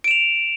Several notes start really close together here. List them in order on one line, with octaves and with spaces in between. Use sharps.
D7 E7 F7